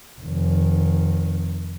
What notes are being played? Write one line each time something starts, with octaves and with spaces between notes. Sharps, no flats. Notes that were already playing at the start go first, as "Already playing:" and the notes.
F1 D#3